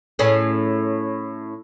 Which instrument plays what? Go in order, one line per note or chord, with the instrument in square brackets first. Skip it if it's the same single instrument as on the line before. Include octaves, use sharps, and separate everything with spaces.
[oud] A2 C#4 G#4